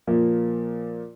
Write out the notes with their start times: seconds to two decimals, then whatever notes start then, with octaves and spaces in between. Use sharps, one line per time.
0.07 A#2 F3 A#3